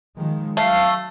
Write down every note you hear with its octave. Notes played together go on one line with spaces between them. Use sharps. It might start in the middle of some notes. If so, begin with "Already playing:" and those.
D#3 F3 G#3
F#3 A3 F5